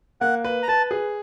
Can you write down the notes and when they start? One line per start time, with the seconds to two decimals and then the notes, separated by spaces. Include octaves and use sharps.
0.21 A#3 F#5
0.45 B4
0.63 A#5
0.68 B4 A5
0.91 G#4